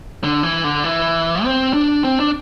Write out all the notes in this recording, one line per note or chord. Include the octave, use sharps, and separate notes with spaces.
D3
E3
D3
E3
C4
D4
C4
D4